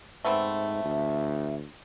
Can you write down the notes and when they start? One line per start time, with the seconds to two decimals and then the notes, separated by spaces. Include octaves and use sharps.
0.25 G#2 A3 B3 C4 E5
0.84 D2